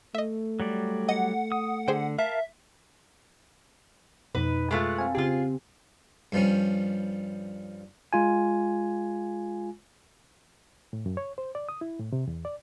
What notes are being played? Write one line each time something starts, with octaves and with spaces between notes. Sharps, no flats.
A3 D#5 E5
F#3 G3 D5
D#5 F#5
D#6
D3 G#4 C5 G5
A#4 E5 F5 A5
F2 B2 D#4 B4
G#3 A3 F4 F#6
C4 F5 G#5
C#3 F4 G4 G#4
G2 F3 G3 C#4
G#3 F4 G#5
A2
F#2
C#5
C5
D5
D#6
E4
A2
C3
E2
D5